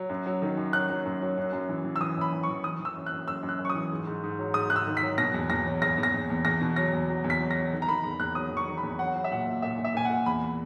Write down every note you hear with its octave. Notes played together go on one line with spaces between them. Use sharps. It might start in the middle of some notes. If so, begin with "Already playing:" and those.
Already playing: F#3
F#2
F#3
D#3
F#2
F#3 F#6
F#3
F#2
F#3
F#2
F#2
E3
E3
E6
E3 D#6
F#2 B5
E3
C#6
E3
E3 D#6
E3
E6
F#2
F#6
F#2
F#2 E6
F#2
F#6
F#2
C#6
D#6
E3
G#2
G#2
G#2
F#3
G#2 D#6
G#2 F#6
E6
D#3
B6
F#3
B2 A#6
E2
E2 A#6
F#3
E2 A#6
E2
A#6
E2
E2
E2 A#6
B2
F#3 A#6
E2
F#3
E2
B6
F#3
A#6
F#3
D#3
A#5
D#3 B5
E2 B5
E2 F#6
F#3 D#6
E2
C#6
D#3
B5
E2
F#3 F#5
F#3
E5
A#2 F#5
A#2
A#2 E5
A#2
E5
A#2 G#5
F#5
A#2
E2 B5